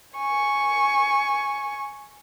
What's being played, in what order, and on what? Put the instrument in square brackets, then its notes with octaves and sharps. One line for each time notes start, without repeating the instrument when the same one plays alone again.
[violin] G#5 C#6